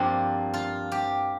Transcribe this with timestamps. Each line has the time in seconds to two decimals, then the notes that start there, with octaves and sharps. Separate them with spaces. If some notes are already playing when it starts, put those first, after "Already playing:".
Already playing: G2 F3 A#3 C4 D4
0.54 F4
0.92 G4